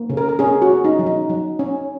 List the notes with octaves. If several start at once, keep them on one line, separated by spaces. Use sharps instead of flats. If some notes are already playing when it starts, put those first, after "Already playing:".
Already playing: A#3
C#3
A#4
A#4
C#4 G#4
F#4
C#4
D#4
F#3
D#4
F#3
C#4